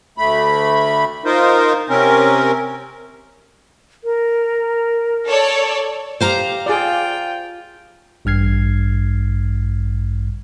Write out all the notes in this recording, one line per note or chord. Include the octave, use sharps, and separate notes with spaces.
D2 A3 B5
D#4 F4 A#4 C5
C3 C4 C#4 A#4
A#4
A4 C#5 D5
G4 C5 F5 A#5
F4 G#4 D5 G5
A1 G2 F6 G#6 C7